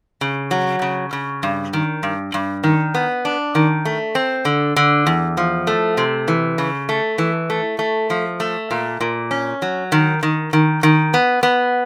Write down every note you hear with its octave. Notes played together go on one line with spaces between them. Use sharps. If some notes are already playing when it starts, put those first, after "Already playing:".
C#3
F#3
C#3
C#3
G2
D#3
G2
G2
D#3
B3
D4
D#3
A3
C4
D3
D3
E2
F3
A3
C3
E3
C#3
A3
E3
A3
A3
F3
A3
A#2
A#2
C#4
F#3
D#3
D#3
D#3
D#3
B3
B3